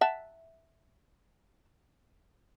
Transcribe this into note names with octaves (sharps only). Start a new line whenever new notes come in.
E5 F#5 A5